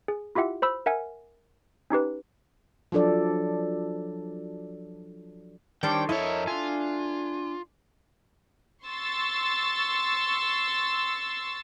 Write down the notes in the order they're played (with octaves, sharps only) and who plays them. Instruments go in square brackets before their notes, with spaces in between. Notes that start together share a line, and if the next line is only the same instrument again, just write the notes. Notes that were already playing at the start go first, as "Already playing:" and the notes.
[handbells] G#4
E4 F4 G4 E5 F#5
C5 B5 E6
A#4 E5 F#5 G#5
C#4 D#4 G4 B4
[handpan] F3 F#3 D4 A4 D5
[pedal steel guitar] D#3 C5 C#5 [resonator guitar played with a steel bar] G3 D4 [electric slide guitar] G5
[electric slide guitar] F2 C#5 [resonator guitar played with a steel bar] E4 A4 [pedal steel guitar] A#4 D#5
[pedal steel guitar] D4 G#5 [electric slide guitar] F4
[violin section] C6 C#6 E6 A6